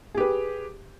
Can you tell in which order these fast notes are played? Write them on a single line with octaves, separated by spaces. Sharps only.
G#4 G4 B4